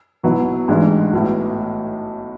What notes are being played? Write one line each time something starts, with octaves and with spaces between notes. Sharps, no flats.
B1 B2 F#3 B3 E4
A1 G#2 G#3 D4
B1 A2 E3